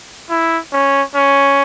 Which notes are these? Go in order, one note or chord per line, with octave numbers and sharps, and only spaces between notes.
E4
C#4
C#4